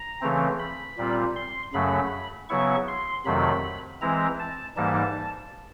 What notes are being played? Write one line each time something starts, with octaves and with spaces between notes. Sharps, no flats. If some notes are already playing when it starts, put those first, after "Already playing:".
Already playing: A#5
C#3 E3 A3 C4
B5
A#2 G3 C4 F4
C6
F#2 C#3 F#3 A3 B5
C#3 F#3 B3 E4 C#6
C6
F2 C3 D#3 F#3 A3 B5
E3 G#3 C4 E4 A#5
A5
G#2 E3 G3 A#3 D#4 A5